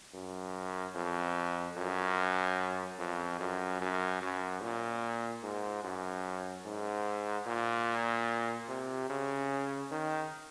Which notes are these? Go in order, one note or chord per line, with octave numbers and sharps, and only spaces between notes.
F#2
F2
F#2
F2
F#2
F#2
F#2
A#2
G#2
F#2
G#2
A#2
C3
C#3
D#3